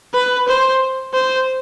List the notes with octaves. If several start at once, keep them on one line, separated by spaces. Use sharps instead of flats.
B4
C5
C5